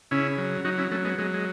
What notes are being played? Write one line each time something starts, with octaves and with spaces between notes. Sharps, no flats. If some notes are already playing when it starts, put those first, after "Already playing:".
C#3 C#4 E4
F#3
F#3 D#4 F#4
C#4 E4
F#3 A3 C#4
G#3 B3
F#3 G#3
G#3